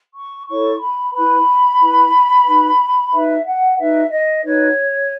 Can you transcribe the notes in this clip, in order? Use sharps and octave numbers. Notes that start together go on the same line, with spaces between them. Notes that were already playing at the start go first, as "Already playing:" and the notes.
C#6
E4 A4 C#5 C#6
B5
E4 B4 B5
E4 B4
D#4 F#4 B4
D#4 F#4 B4 E5
F#5
D#4 F#4 B4 E5
D#5
D#4 F#4 B4 C#5